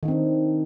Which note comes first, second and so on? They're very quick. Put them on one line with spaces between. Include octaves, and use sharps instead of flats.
D#3 D#4 C4 D4